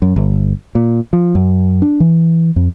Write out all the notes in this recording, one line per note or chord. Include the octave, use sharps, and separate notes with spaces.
F#2
G1
A#2
F3
F#2
D4
E3
F2